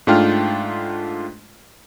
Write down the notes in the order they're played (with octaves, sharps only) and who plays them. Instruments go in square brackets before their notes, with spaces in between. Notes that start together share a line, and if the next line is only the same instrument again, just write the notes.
[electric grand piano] G#2 A3 D4 F4 G5 F6